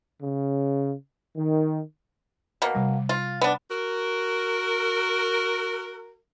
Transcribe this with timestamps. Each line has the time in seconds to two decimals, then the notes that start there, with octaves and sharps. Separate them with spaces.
0.22 C#3
1.36 D#3
2.62 B2 A#3
2.75 C3 G3
3.09 F4
3.41 B3 D4
3.71 F#4 A#4